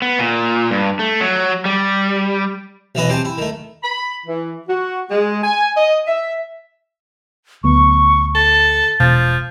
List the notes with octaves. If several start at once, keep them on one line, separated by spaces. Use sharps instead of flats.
B3
A#2
G2
A3
F#3
G3
B1 E3 B3 E4 B4 D#5
C4 G4 G#5 A5
E4
D#3 A3
B5
E3
F#4
G#3
G#5
D#5
E5
D2 F#3 B3 C#6
A4 A6
E1 B2 F3